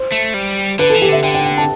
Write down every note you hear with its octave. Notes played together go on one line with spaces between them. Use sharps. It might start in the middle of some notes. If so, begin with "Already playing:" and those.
Already playing: C5
A3
G3
D3 B4
E3 A4
G4
D3 E5
D3 G5
G5
G5
A5